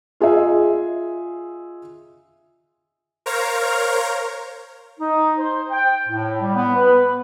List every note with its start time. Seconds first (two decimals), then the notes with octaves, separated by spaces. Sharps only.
0.20 F4 G#4 D#5 E5
3.26 A#4 C5 C#5 F5 A#5
5.00 D#4
5.38 C5
5.71 G5
6.08 A2
6.42 G3
6.55 B3
6.75 B4